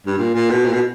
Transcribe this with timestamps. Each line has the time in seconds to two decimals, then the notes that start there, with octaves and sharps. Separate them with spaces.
0.06 G2
0.18 A#2
0.35 A#2
0.50 B2
0.65 A#2
0.73 B2